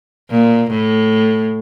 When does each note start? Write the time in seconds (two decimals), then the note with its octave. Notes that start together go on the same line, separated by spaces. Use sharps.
0.31 A#2
0.71 A2